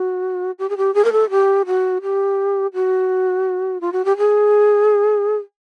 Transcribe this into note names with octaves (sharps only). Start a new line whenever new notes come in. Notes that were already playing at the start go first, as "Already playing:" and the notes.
Already playing: F#4
G4
G#4
G4
G#4
A#4
A4
G4
F#4
G4
F#4
F4
F#4
G4
G#4